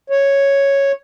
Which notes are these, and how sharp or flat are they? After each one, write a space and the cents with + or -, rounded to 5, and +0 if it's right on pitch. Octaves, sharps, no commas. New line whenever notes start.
C#5 +0